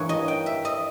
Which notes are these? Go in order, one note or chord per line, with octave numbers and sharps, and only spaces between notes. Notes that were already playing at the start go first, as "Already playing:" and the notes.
Already playing: G2 E3 A#3 D#4 C#5
D#5
G5
E5
D#5